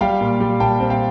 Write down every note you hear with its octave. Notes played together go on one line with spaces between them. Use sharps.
G3 F5 G5
A#2
G3
A#2 G5 A5
C4
F5 G5